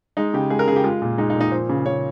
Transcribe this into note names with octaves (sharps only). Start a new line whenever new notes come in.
G#3 D#4
C#3 G4
G#3 G#4
A#4
C#3 G#4
G4
G#3 F4
A#2
G#3 D#4
D#4
A#2
D#4
F3 C5
C#3
C#3 C#5